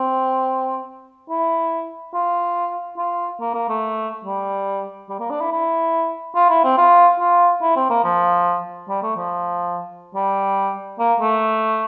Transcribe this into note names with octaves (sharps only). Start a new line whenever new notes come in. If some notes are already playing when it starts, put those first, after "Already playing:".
Already playing: C4
E4
F4
F4
A#3
A#3
A3
G3
G3
A#3
D4
E4
E4
F4
E4
C4
F4
F4
E4
C4
A#3
F3
G3
A3
F3
G3
A#3
A3